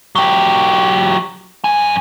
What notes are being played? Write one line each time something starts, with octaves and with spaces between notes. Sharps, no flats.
F#3 G4
F#2 G#5